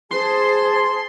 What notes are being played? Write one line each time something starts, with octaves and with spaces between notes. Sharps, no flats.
G#4 C5 A5 C6